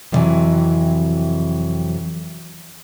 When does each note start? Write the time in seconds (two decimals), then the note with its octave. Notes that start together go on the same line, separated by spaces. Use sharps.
0.12 F2 A2 C3 D#3 E3 F#3